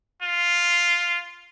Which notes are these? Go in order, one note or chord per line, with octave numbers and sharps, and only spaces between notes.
F4